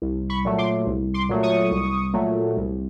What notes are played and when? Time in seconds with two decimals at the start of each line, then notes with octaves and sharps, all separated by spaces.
0.02 C2
0.30 B5 C#6
0.45 A#2 F#3 A3
0.58 C6 D6
0.86 C2
1.14 C6 D6
1.29 A#2 F#3 A3
1.43 C#6 D#6
1.71 C2
2.13 A#2 F#3 A3
2.57 C2